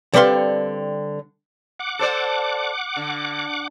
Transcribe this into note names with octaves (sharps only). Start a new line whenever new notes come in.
D3 G3 C4 B4 F5 C6
F#5 D6
A4 C5 D5
D3